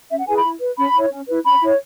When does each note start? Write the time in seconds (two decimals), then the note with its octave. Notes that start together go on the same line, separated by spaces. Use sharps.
0.11 C#4 E5
0.18 F#5
0.28 E4 G#4 B4 G#5
0.36 B5
0.45 E4
0.61 B4
0.77 C#4 B5
0.94 E4 C#5
1.10 C#4
1.28 E4 B4
1.44 C#4 B5
1.61 E4 C#5